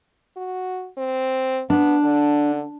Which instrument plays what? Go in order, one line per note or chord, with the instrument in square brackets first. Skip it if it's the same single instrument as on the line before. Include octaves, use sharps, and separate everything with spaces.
[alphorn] F#4
C4
[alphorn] B3 [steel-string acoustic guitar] D4
[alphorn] D3